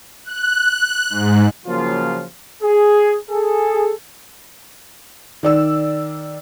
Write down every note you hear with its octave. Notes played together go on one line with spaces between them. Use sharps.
F#6
G#2
C#3 F3 F#3 A#3 F4
G#4
G#4 A4
D#3 D5 E6